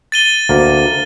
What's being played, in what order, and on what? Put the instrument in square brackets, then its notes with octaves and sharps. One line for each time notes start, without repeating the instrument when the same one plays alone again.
[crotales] A6 D#7 G7
[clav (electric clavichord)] D2 A#3